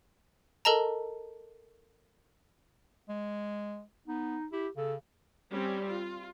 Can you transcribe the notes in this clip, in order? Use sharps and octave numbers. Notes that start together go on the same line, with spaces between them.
A4 A#4 D#5 A5 A#5
G#3
B3 D#4
E4 G4
C#3 A4
G3 C4 C#4
F4